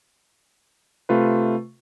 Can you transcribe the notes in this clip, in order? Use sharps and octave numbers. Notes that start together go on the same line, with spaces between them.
C3 A3 F4 B4